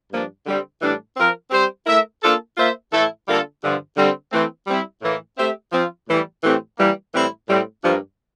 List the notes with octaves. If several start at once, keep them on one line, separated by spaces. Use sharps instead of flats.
G2 F3 A#3 D4
D3 G3 C4
A2 E3 G3 D4
F3 C4 F4 A#4
G3 C4 G4 C5
A3 E4 A#4 E5
A#3 D4 F4 A4
A#3 F4 C5 E5
A2 E3 A3 E4 A4
D3 G3 A#3 F4 A4
G2 D3 F3
D3 G3 C4
E3 A3 C4
G3 C4 E4
A2 E3 A#3
A3 C4 G4 C5 E5
F3 C4 F4
A2 E3 G3
A2 E3 A3 C4 G4
E3 G3 A#3
A2 E3 G3 C4 E4
A2 G3 C4
G2 F3 A#3